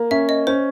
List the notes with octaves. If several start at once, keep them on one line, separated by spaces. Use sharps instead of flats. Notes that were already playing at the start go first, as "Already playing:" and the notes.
Already playing: A#3
C#4 E5
D#5
C#4 C5